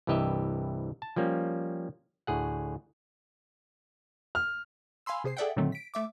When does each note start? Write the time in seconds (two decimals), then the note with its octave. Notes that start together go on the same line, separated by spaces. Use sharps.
0.07 C2 G2 E3 G4 D#5 E5
1.02 A5
1.16 F3 G3 A#3 C#4
2.27 D2 A2 G#4 F#5
4.35 F6
5.06 F5 G#5 B5 C6 E6
5.24 C3 G#4 C5 C7
5.37 G#4 A4 D5 E5 F#5 G5
5.56 A#2 D3 D#3 F#3 A3 C4
5.72 B6 D7
5.94 A3 E5 D6